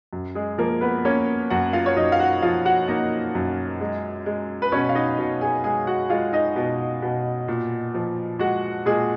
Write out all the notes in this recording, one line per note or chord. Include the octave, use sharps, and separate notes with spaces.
F#2
G#3 G#4
F3 A#3 A#4
B3 B4
A#3 C#4 C#5
F#2 F#4 F#5
F4 F5
C#5
F#2 D#4 D#5
F5
F#4 F#5
F3 F4 F5
F#4 F#5
A#3 D#4 D#5
F#2
G#3
G#3
B4
B2 C#4 C#5
F5
D#4 D#5
B2
G#4 G#5
G#3 G#4 G#5
F#4 F#5
G#3 F4 F5
D#4 D#5
B2
B2
A#2
F3
G#3 F#4 F#5
A#2 G#3 G#4